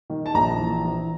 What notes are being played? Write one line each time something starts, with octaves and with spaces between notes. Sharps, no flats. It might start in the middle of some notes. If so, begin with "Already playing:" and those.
D#3
A5
A#1 A#5
E3
E3